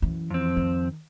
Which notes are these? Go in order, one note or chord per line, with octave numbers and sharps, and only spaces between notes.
F#2 E3
F2 C4
D#3